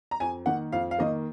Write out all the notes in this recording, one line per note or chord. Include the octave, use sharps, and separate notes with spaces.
A#5
F2 G#5
D#3 A#3 F#5
F2 F5
F5
D#3 A#3 D#5